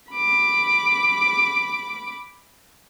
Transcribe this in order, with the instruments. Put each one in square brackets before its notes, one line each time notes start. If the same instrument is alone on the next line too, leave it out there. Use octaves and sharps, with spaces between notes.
[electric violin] B5 D6